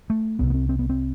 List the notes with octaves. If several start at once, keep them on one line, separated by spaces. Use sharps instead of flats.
A3
C2 C3 B3
B3
C4
C4
B3
C4